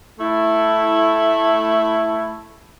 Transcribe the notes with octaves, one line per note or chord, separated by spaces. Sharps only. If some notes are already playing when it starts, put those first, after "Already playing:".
A3 E4